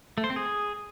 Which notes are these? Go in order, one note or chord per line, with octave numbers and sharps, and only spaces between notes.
A3
C5
C4
G#4